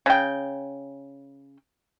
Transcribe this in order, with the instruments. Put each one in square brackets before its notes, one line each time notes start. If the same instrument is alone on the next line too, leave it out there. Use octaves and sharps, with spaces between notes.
[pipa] C#3 G5